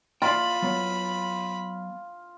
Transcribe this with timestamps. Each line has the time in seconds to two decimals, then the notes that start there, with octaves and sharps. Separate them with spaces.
0.22 F4 D5 F5 G5 B5
0.62 F#3 B3